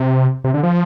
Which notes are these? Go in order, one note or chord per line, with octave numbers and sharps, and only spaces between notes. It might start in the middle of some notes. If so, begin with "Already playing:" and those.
Already playing: C3
C3
D3
F3